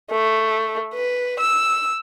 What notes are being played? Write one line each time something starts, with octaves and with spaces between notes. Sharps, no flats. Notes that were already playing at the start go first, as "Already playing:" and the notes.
A3
B4
E6